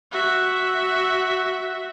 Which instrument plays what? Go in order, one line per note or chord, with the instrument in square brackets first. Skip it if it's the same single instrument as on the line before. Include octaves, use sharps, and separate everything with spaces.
[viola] F#4 E5